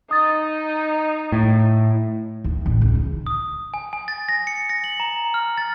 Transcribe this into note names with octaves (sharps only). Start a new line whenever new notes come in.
D#4 D#6 A6
A2
D#2
A1
C#2
D#4
D#6
G#5
G#5
A6
A#6
C#7
A#6
F#7
A#5
F6
A6